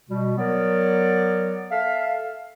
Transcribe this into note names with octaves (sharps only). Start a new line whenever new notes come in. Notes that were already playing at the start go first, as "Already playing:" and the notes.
B2 G3
F#3 B3 A#4 C#5 D5
A4 E5 F5